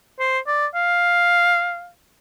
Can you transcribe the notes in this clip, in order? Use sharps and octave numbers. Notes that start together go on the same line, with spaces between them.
C5
D5
F5